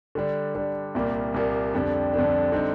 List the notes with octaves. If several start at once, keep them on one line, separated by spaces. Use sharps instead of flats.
D3 G3 D4
D3 G3 D4
C2 A#2 G3 A#3
C2 A#2 G3 A#3
F2 D3 G3 D4
F2 D3 G3 D4
D3 G3 C4 D#4